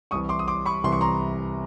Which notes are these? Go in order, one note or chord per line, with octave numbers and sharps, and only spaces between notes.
C2 C3 E3 C#6 D#6
C6 D6
D#6
C6 D6
B5 C#6
C2 C3 E3 C6
C#6
A#5 C6